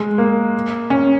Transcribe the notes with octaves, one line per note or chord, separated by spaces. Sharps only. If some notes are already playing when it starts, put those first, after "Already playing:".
Already playing: G#3
A#3
C#4